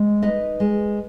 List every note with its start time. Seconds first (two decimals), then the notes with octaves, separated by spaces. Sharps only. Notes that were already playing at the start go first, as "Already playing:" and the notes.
Already playing: G#3
0.22 D#4 B4 D#5
0.60 G#3